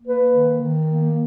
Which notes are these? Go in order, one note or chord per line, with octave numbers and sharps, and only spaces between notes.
A#3 B4
D#3
D#3
A#3